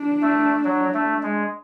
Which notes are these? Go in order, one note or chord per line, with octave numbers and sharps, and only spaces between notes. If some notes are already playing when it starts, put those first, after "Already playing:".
Already playing: D4
A3
F#3
A3
G#3